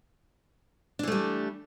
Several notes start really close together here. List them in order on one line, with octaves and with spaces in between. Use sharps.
D4 E3 A3 G3